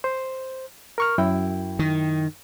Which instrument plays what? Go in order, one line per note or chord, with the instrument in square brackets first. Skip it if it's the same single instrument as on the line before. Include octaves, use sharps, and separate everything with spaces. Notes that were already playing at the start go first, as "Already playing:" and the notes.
[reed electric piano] C5
A#4 C#6 F6
F#2 E4 G5
[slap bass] D#3